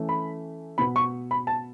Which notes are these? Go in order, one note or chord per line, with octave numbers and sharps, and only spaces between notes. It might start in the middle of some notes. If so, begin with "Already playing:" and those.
Already playing: E3 A3 C#4
B5
B2 B3 B5
C#6
B5
A5